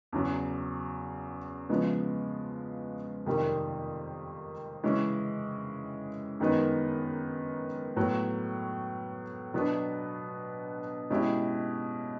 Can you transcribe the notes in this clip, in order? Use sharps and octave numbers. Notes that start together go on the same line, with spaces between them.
E2 C#3 F#3
C#3 F3 G#3 B3
F2 C3 D#3 G3 A#3
C#3 E3 G#3 C#4
F#2 D#3 G#3 B3 D#4
A2 F#3 B3
B2 F#3 B3 D4
B2 G#3 C#4 E4 G4